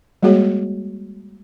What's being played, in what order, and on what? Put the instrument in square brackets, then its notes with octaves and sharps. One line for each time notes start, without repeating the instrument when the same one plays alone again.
[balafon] G3 G#3 A#3 F#4 G#4 C#5